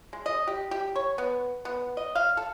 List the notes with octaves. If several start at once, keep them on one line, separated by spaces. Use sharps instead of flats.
G#3
D#5
G4
G4
C#5
B3
B3
D#5
F5
A4